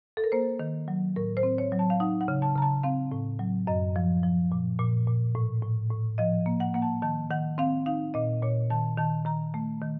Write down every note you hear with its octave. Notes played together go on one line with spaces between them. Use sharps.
A4
A#4
A#3 C5
D#3
F#3
A2 A#4
C5
C4
C#5
F#3
A5
F5
D#4 F#5
F#5
C#3
A5
C#3 A#5
A5
C4 F5
A2
F#3
F#2 D#5
F3
F3
A#2
A#2
A#2
A2
A2
A2
F3 D#5
A#3
F#5
A#3 F#5
A5
D#3 A5
D#3 F#5
C4 F5
D#4 F5
A#2 D#5
A#2 C#5
D#3 A5
D#3 A5
D#3 A#5
A3
D#3